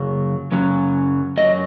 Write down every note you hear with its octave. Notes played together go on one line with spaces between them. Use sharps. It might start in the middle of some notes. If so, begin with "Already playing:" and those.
Already playing: F#2 C#3 F#3
F#2 C#3 F#3
F#2 C#3 F#3 D#5